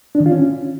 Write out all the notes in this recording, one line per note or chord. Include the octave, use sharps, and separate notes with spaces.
D4
D#3
F4
C#4